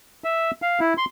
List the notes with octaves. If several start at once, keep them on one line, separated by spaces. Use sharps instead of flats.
E5
F5
E4
C6